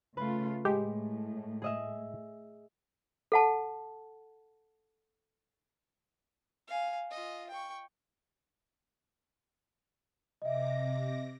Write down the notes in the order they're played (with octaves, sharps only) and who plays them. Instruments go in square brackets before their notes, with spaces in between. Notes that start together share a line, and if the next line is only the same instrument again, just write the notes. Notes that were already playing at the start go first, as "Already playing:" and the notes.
[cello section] C#3 A3 F4 [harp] B4
[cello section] A2 [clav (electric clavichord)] G#3 [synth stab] G4
[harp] G#4 D#5 E5
[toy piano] A4 F#5 A5
[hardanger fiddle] F5 G#5
F4 D#5
G5 C#6
[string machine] C3 D6 A#6 [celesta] D#5 E5